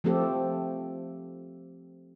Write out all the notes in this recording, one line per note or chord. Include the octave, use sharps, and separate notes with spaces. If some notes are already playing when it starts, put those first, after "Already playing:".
F3 A3 C4 G4 A4